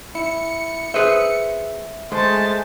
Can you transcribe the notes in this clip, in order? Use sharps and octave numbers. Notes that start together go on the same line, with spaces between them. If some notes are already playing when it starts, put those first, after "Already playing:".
E4 C#7
G#4 B4 C5 E5
G#3 A3 C5 A5